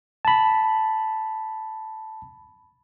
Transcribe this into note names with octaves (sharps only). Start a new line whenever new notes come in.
A5 B5